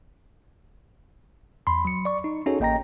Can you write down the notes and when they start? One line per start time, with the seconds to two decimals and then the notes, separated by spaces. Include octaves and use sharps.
1.67 E2 B5 C6
1.85 F#3 C#7
2.05 D5 C#6
2.24 D#4
2.46 C#4 D#4 F#4 G#4 A4 C#5
2.60 A1 A#3 D#5 G5 A#5 A#6